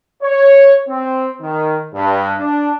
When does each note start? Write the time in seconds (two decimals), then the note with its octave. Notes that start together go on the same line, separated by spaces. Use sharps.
0.23 C#5
0.89 C4
1.42 D#3
1.94 G2
2.39 D4